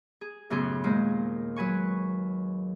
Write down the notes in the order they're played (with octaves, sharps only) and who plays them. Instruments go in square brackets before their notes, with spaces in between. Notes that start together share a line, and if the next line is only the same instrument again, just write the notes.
[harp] G#4
F#2 A2 C#3 B3 G#4 C6
D#2 A#2 G#3 C5
F#3 B4 G#5 C#6